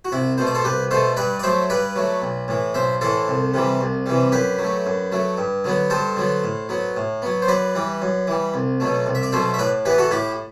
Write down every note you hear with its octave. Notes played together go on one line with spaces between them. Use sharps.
F#4
C2 E4
B2 A3 C5
D5
A4 C5
C2 G4 B4
B2 A3 A4 C5
G2 B4 D5
D5
F#3 A3 C5 E5
G2 B4 D5
F#3 A3
B1
A2 E3
B1 C5 E5
A2 E3 A4 C5
C2
C3 E3 G3
C2
C3 E3 G3
F#2 G4 B4
F#3
A3
F#2
F#3 A3
G2
D3 F#3 B3
G2 A4 C5
D3 F#3 B3
A2
F#3 B3
A2
F#3 B3
C5
F#2 B4 D5
E3 G3
F#2
E3 G3
C2
B2 F#3 A3
C2
E5
D5
B2 F#3 A3 C5 E5
E5
A2 B4 D5
E3 B3 G4 B4
F#4 A4
A2 E4 G4